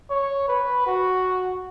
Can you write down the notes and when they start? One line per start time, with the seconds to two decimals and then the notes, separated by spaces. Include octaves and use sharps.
0.10 C#5
0.48 B4
0.86 F#4